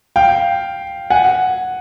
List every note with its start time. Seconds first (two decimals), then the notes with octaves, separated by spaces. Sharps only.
0.16 F5 G5
1.10 F#5 G#5